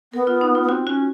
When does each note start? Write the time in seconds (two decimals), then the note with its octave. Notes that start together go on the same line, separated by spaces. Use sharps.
0.13 B3 A#4
0.27 F4
0.41 D#4
0.55 F4
0.63 B3
0.69 C4 F#4
0.87 C#4 F#4